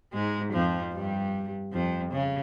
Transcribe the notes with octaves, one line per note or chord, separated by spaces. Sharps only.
G#2 G#3
F2 F3
G2 G3
F2 F3
C#3